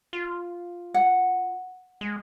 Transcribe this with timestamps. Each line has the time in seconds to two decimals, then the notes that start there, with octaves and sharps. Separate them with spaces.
0.13 F4
0.94 F#5
2.01 G#3